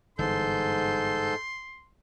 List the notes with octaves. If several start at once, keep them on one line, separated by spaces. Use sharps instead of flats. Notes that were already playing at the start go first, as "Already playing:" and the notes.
G1 G#2 E3 A4 C6 G6